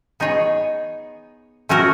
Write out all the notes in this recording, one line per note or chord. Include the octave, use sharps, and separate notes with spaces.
B3 D#4 G#4 C#5
A3 C#4 F#4 A#4